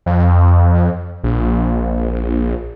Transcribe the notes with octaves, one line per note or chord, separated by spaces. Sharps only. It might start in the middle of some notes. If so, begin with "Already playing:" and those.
F2
A#1